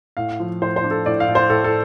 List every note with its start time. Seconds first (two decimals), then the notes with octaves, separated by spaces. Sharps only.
0.17 A2 F5
0.40 F3
0.62 A2 C5
0.76 C5
0.84 D4
0.91 A4
1.06 A2 D5
1.20 F5
1.28 A2
1.35 C5
1.50 A2 A4
1.64 A4